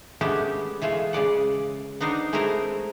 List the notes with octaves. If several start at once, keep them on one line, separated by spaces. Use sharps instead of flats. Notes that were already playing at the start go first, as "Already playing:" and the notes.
G#3 A3 B3 C#4 D4 G4
E3 G#3 A3 F4
C#3 G#3 D5 F#5
B3 D4 D#4 A#4 C5
G#3 A3 C4 E4 A#4 C5